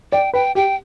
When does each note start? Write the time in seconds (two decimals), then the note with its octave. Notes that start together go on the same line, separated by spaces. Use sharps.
0.12 D5 G5
0.33 B4 G5
0.55 G4 G5